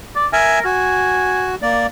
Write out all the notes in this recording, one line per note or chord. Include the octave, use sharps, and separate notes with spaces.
D5
A#4 E5 G#5
F#4 G#5
A#3 D5